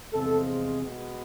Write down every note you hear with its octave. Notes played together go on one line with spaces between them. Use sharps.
E2 C3 F3 G#3 A4
G#4
B2 G#3 B3